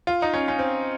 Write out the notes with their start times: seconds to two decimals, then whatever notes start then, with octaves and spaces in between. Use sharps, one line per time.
0.07 F4
0.22 D#4
0.34 C#4
0.48 C#4
0.59 C4